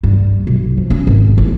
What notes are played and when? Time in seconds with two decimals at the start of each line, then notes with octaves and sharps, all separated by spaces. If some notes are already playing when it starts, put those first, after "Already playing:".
0.03 G2
0.47 B1
0.77 F3
0.90 C#4
1.07 G#1
1.38 A1